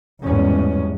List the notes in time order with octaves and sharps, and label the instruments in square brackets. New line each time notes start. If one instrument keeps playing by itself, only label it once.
[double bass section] G#1 E2 A2 G3 G#3 C#4